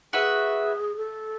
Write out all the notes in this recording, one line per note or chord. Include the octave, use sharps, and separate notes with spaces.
F#4 G#4 B4 E5
A4